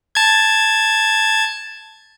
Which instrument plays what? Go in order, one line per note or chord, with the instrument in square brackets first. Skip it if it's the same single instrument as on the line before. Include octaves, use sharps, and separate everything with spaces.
[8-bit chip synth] A5 G#6